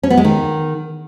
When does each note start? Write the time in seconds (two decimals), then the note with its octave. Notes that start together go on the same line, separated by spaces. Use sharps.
0.03 C#4
0.10 B3
0.17 G#3
0.25 D#3